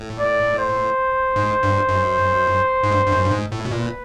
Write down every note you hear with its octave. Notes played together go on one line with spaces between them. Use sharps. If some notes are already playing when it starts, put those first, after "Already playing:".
Already playing: A2
D5
C5
G#2
G2
F#2
G#2
G2
G2
F#2
G2
G#2
A2
B2
A#2 B4